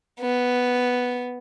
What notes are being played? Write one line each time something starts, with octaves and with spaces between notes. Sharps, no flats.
B3